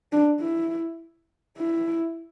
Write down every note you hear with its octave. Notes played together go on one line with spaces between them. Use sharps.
D4
E4
E4